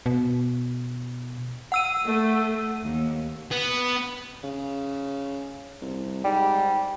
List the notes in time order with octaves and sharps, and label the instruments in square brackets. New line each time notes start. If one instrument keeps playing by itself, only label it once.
[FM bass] B2
[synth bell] F#5 E6 D#7
[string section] A3
D#2
[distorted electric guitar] B3
[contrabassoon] C#3
C2
[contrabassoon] G#2 [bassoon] G3